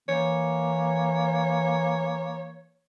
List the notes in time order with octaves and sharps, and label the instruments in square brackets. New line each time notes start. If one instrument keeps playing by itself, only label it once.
[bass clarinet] E3 [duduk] A#3 [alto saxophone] C#5